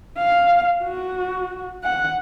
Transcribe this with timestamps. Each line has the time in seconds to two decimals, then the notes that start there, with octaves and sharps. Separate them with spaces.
0.18 F5
0.84 F#4
1.84 F#5